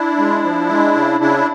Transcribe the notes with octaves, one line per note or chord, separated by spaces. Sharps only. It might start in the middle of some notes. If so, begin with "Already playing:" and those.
Already playing: D4 E4
G#3
F3
G#3
C#3
C#3 D4 E4